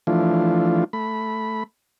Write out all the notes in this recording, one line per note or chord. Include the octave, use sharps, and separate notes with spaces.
E3 F3 A3 D4 F4
A3 B5